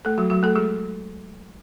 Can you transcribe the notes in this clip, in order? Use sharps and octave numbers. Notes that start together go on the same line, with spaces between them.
A3 A4
F#3 F#4
F#3 F#4
A3 A4
G#3 G#4